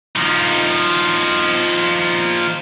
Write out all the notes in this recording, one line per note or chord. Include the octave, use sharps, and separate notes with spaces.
F3 D#4